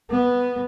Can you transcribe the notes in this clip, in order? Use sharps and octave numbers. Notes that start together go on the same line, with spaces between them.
B3